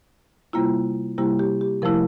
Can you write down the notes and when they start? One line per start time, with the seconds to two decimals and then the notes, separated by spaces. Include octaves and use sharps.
0.53 C3 G3 A#3 E4 F4
1.18 C3 G3 A#3 E4 G4
1.39 G4
1.61 G4
1.82 C3 F3 A3 E4 A#4